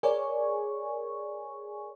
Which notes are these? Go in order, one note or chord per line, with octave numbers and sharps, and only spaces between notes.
G#4 A#4 C#5 D5 G#5 C#6